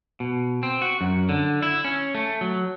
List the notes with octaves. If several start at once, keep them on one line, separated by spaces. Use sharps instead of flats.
B2
C4
F#4
F#2
D3
E4
C#4
A3
F#3